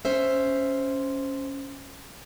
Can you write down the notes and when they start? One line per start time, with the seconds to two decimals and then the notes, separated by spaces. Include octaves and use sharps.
0.05 C#4 C5 E5